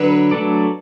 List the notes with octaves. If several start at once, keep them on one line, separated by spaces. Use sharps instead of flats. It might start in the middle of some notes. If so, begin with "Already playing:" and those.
Already playing: D3 F#3 D4 B4
F#3 A3 D4 A4 D5